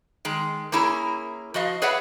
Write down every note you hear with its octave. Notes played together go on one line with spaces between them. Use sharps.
D#3 G#3
A#3 C#4 E4 G#4 A#4
F3 F#4 D#5 F5
G#4 B4 C#5 D5 E5 F#5